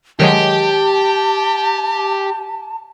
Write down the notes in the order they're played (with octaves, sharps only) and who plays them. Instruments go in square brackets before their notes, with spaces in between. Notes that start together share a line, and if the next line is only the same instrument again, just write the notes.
[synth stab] D#3 F#3 G#3 [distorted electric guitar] G4 [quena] A5